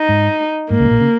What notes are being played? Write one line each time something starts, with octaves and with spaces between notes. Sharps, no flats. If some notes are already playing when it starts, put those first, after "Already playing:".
Already playing: D#4
G#2
G#2 A#3
C#2 C#3
G#2
A#1 A#2
C#3